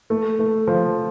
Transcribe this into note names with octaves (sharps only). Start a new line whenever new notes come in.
A3
A3
F3